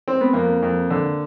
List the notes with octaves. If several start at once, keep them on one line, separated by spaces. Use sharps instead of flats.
C4
B3
F2 A#3
F2
D3